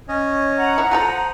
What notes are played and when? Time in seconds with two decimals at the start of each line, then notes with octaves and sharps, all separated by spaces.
0.08 C#4 C#5 D#5
0.56 F#5 A#5
0.78 E4
0.91 F4 G#4 A4 C5 D#6